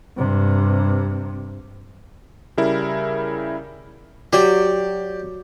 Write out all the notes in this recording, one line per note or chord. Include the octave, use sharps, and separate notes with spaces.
G2 C3
C#3 G3 E4 A#4
F#3 G4 D5 G5